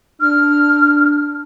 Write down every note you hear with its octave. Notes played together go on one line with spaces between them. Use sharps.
D4 F6